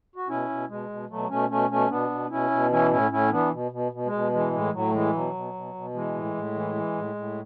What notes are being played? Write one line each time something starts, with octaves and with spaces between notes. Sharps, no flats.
F#4
B2 C#4 E4
B2
B2 G#3
B2
B2 F#3 A3
B2 A3 C#4
B2 A3 C#4
B2 A3 C#4
B2 B3 D4
B2
B2 C#4 E4
B2
E3 C#4 E4
A2 C#4 E4
A2 C#4 E4
E3 B3 D4
B2
B2
B2
G#3
B2
E3 G#3
A2 G#3
A2 F#3
A3
E3 G#3
B2 F#3
B2
B2
B2
E3 G#3
A2
A2
E3
E3
A2
A2